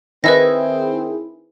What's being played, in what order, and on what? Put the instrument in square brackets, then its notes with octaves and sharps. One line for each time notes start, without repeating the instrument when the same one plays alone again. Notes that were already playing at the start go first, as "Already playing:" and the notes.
[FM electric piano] D#3 E4 G#4 [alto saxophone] C4 [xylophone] B4 D#5 A#6